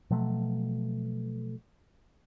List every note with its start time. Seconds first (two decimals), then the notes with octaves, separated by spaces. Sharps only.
0.10 B2 F3 F#3 A3